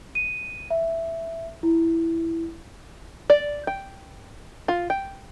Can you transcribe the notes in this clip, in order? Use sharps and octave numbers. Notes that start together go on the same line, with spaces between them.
D#7
E5
E4
D5
G5
F4
G5